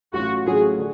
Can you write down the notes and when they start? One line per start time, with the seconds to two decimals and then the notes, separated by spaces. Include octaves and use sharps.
0.14 A1 A2 F#3 C#4 F4 F#4
0.46 A1 A2 F#3 C#4 F4 G#4
0.79 D3